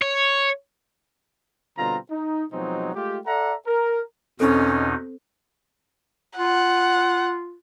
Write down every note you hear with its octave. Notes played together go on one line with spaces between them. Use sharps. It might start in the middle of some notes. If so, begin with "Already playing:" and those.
C#5
B2 D3 G3 C4 F4 A#5
D#4
B2 F3 F#3 G#3 C4 D#4
G#3 A3 F4 G4
A4 D5 E5 F#5 A#5
A#4
E2 B2 C4 C#4 D#4 A4 C5
F4 F#5